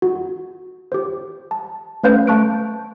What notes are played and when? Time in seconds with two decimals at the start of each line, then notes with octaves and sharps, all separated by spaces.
0.02 F#4
0.92 G4 C5
1.51 A5
2.03 A3 C#4 B4 C5 F5 G6
2.27 A3 A5 C#6 F#6 D7